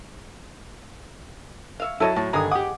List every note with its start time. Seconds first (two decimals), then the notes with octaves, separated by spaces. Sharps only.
1.80 C#5 E5 F5
2.00 F#3 E4 A4 C#5 D#5 A5 D#7
2.16 A2 A5
2.33 G2 D3 D#3 G#3 B3 G#4 A#5 D#6
2.51 G4 F#5 D6 D#6